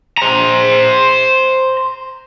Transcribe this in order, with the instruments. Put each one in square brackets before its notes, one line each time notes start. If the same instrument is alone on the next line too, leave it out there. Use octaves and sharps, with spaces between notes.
[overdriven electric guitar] C5 A#5